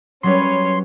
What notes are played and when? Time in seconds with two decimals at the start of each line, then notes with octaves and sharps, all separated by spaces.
0.23 F#3 G3 C#4 B4 C#5 C6